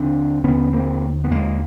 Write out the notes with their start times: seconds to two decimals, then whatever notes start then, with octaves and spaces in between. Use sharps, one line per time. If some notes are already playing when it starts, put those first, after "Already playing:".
Already playing: D#2 D3 C4 D4
0.44 D#2 D3 B3 C#4
0.73 A#3 C4
1.24 B3
1.31 D#2 D3 G#3 A#3